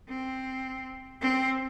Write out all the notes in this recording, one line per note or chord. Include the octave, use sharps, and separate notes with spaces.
C4
C4